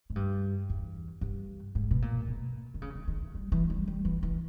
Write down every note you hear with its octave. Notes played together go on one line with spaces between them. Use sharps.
G#2
G2
E2
G2
G#2
B2
A#2
B2
D#3
C#3
D#3
D#3
E3
G3
E3
G3
G3
E3
E3